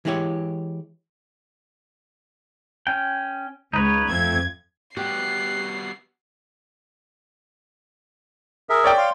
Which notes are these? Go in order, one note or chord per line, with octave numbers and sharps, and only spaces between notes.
E3 G#3 E4 G4 C#5
C#4 G5
C#2 D#4 B4 C#5
F2 F3 A3 C4 G#6
G3 B3 F#4 G4 F#6 C7
G#4 A#4 E5
C#5 D5 G5
F5 C6